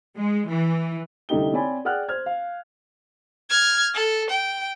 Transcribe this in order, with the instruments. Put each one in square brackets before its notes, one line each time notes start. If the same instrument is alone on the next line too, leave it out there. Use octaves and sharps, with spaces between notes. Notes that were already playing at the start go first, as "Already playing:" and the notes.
[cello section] G#3
E3
[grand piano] C2 D3 A3 D#4 G4 G7
C4 C#5 D5 G#5 B5
G#4 D5 F#5 G5 F6 F#6
C5 F6 G#6
F5
[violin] F6 G#6
A4
G5